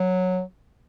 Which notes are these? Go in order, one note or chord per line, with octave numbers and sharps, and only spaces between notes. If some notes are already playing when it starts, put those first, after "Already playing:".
Already playing: F#3